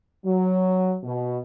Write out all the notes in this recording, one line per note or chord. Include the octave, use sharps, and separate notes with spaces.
F#3
B2